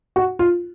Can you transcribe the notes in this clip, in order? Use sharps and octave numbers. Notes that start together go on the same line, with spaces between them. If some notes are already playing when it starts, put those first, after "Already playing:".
F#4
F4